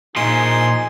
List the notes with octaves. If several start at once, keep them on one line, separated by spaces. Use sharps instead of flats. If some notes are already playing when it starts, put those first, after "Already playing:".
A#2 F3 D#4 G#4 G#5 C6